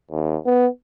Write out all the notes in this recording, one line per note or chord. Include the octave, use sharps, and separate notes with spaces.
D#2
B3